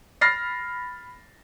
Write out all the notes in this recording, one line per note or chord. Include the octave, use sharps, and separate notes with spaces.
B5 F6 A6 A#6 C7